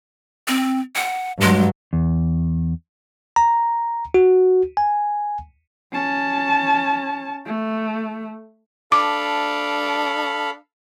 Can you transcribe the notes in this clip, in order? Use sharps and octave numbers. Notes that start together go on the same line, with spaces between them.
C4
F#5
G2 F#3 G#3
E2
A#5
F#4
G#5
C#4 A5
A3
D4 A4 F5 B5 D6